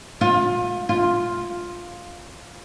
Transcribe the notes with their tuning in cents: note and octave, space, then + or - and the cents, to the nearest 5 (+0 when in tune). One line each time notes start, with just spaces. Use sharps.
F4 +30
F4 +5